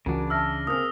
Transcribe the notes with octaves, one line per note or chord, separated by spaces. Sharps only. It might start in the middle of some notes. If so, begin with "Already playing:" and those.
C#2 C#3 E3 C#4 D4 F#4 A#4
E5 A5 E6 F6 A#6
A#3 C4 G#4 D#6 F6